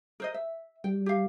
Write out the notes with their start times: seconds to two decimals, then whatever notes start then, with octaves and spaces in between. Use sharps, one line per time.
0.20 A#4 C5 D#5
0.34 E5
0.84 G3 G5
1.06 G4 F5